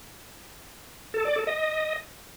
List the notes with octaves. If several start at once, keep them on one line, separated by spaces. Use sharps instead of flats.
A4
D5
A4
D#5